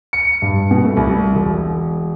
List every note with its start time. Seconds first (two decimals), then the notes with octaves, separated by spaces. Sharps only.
0.13 C#7
0.42 G2
0.71 B2
0.85 A3
0.97 C2
1.35 E1